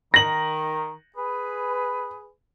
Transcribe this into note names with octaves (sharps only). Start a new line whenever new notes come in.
D#3 A#6 F#7
G#4 B4